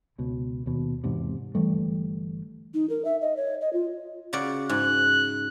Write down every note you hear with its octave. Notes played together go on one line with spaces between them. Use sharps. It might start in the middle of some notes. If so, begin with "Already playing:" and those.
C#2 B2
D#2 B2
E2 G#2 C3
G1 E3 G3 A3
D#4
A#4
E5
D#5
C#5
D#5
F4
C#3 F#4 D5
G#2 F#6